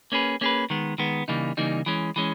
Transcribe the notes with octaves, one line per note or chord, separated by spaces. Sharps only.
A#3 C#4 G#4 B4
A#3 C#4 G#4 B4
D#3 G#3 B3
D#3 G#3 B3
C#3 E3 G3 A#3 D#4
C#3 E3 G3 A#3 D#4
E3 G#3 C#4
E3 G#3 C#4